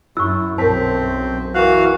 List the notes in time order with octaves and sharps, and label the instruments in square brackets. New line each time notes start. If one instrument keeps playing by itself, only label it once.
[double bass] F#2 [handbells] E4 [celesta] C#6 E6
[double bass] B1 F#2 [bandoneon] C4 [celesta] A#4 A5 [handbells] C5 B6
[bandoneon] E3 F#4 F5 [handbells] A#4 F#6